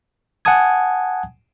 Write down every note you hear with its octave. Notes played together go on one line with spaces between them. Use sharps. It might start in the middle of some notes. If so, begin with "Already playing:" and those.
F#5 G#5 A5 D#6 G#6